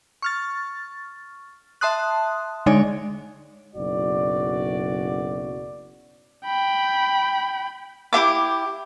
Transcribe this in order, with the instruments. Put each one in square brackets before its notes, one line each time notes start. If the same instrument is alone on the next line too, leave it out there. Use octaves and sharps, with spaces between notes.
[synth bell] C#6 F6 A6
E5 A5 C6 D#6 F#6
D3 G#3 D#4 C#5 D5 G#5
[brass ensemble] F#1 B1 F#4 D5
[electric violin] G5 B5
[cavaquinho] E4 G4 E5 D6